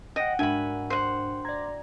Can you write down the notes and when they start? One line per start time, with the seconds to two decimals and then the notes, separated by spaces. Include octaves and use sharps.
0.16 D#5 F#5 G5
0.39 G#2 D4 F#4 A#4 E5 G#5 B5
0.90 C5 F#5
1.45 D5 A#5 G#6 A#6